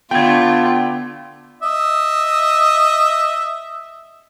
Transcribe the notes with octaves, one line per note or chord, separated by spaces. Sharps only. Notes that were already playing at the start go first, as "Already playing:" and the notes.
D3 A3 B3 F4 G5 G#6
D#5 E5